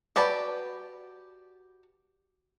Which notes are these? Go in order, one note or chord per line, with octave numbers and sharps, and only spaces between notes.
F#4 G4 B4 D5 A5